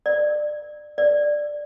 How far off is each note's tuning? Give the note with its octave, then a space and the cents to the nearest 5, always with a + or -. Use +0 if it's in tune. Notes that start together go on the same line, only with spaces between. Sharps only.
D5 +25
D5 +5